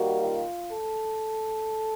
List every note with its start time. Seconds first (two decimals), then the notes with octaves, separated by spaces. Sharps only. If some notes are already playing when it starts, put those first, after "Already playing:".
Already playing: D#3 G3 A#3 F#4
0.22 F4
0.71 A4